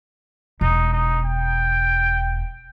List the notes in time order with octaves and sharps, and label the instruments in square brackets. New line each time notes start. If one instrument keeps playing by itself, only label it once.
[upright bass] E1 [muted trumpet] D#4
[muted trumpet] D#4
G5